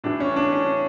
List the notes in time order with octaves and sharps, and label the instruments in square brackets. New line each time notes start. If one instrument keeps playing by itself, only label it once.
[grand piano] A2 E3 D4
C#4
D4
C#4